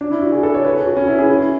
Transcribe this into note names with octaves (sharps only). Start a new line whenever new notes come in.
D4
E4
F#4
G#4
A4
C#5
B4
G#4
F#4
C#4
E4
G#4
E4